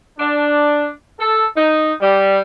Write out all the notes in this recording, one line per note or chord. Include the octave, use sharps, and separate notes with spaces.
D4
A4
D#4
G3